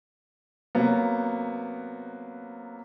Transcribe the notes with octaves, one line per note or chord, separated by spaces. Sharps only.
C3 F#3 A#3 B3